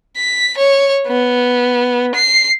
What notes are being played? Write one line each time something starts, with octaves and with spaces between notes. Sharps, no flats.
B6
C#5
B3
C7